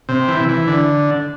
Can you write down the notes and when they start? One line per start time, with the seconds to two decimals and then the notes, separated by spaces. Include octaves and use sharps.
0.09 C3
0.28 E3
0.49 E3
0.67 D3